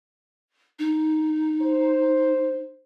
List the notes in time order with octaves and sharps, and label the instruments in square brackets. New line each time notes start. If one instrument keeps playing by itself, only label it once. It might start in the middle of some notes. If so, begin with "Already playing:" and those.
[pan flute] D#4
[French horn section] C5